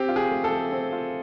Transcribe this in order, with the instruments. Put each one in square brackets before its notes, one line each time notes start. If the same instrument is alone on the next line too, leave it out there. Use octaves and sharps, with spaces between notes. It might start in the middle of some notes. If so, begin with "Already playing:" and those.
Already playing: [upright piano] C4 [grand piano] G4
[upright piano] F4
[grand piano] G#4
[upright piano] A3
[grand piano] A4
[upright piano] A3
C4
F4